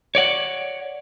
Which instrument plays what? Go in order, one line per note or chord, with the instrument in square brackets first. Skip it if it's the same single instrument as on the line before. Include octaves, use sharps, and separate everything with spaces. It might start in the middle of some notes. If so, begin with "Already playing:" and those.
[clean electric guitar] C#5 D5 F#5